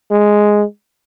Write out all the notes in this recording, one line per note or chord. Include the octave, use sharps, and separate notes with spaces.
G#3